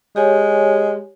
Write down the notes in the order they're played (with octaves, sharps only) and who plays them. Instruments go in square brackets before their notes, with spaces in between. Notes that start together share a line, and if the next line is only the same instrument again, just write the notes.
[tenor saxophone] G#3 [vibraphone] G4 C#5 G#5